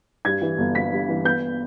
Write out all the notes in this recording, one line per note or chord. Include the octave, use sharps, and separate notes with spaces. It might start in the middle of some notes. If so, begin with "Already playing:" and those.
G2 G#6
E3
G1
G1 B6
G2
E3
B3 G6